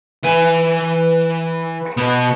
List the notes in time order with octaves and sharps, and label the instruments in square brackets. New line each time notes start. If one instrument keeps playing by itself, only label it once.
[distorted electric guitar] E3 G#5 [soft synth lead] B4
[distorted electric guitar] B2 B3